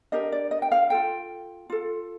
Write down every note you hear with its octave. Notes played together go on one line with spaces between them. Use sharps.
D4 G4 A#4 D#5
D5
D#5
G5
F5
F4 A4 G5
F4 A4